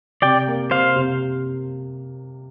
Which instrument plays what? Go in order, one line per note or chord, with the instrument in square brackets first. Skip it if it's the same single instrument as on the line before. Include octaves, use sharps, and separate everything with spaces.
[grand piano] C3 [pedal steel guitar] D5 G5
[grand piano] A#3
[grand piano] C3 [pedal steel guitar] C5 F5
[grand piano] C3